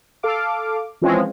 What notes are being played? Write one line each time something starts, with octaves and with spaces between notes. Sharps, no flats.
A4 F5 D6
E3 F3 G#3 C4 C#4 F4